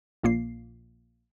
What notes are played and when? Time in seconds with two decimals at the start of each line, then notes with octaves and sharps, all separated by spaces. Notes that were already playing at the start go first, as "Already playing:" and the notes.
0.23 A#1 A#2 A#3 C7